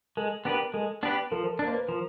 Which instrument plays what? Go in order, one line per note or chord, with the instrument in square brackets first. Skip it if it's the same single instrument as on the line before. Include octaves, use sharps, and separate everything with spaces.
[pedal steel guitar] G#3 [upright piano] A4
[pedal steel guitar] B3 D4 G4 B4 [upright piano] A#4
[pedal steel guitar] G#3 [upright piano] A4
[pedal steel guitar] B3 D4 G4 B4
[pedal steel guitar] F3 [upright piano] A4
[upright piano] A4
[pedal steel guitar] D4 [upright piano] A#4
[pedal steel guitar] A#3 [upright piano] C5
[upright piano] B4
[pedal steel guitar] F3 [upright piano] A#4